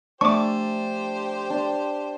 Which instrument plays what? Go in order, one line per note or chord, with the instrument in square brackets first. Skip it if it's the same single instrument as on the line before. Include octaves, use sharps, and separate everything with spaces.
[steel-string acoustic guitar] F3 A3 G#5 [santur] D4 [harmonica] G4 C5 [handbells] C#6 D6
[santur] D4